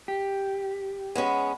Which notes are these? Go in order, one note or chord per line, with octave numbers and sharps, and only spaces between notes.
G4
G#3 B3 C#4